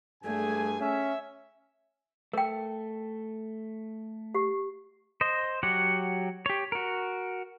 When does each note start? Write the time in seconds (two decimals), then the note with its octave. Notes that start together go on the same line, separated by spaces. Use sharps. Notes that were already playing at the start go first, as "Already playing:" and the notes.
0.24 G2 A3 G#4 G#5
0.81 C#4 E5
2.33 A3 A#4 G5
4.35 G4
5.21 C5 D#5
5.63 F#3 G4 C#5 F#5
6.46 G4 C#5
6.72 F#4 A#4